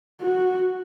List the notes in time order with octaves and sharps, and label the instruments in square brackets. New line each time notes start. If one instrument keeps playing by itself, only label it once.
[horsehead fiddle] F#4